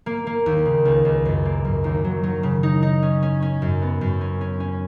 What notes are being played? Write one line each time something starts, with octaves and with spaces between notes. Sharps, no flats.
A#3
A#3
D#2
C#3
C#2
C#2
F#2
A#3
F#2
D#2
F#3
F#3
C#3
D#4
D#4
C#4
C#4
C#4
F#2
B3
F#2
C#4
C#4
C#4